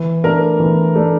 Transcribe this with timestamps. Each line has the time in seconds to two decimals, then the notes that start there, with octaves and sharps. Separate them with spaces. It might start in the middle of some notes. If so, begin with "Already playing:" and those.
Already playing: E3
0.24 A3 D4 A#4 A#5
0.60 E3
0.96 A3 D4